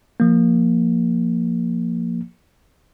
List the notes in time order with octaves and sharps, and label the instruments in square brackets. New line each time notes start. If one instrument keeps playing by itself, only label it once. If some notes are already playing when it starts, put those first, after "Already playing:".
[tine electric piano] F3 A#3